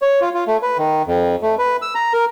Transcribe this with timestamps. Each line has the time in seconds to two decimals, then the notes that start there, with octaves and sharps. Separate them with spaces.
0.02 C#5
0.21 F4
0.34 F4
0.47 A3
0.62 B4
0.78 D#3
1.07 F2
1.42 A3
1.59 B4
1.82 E6
1.95 A#5
2.13 A#4